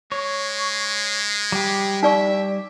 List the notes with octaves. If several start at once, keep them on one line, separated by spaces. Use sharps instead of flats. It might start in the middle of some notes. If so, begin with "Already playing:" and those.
G#3 C#5
G3 G4
D#4 D5 E5 C#6